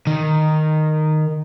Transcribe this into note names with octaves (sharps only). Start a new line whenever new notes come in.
D#3